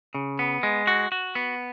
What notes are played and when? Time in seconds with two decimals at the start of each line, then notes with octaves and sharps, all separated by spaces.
0.15 C#3
0.39 B3
0.63 G#3
0.87 F#4
1.12 F#4
1.35 B3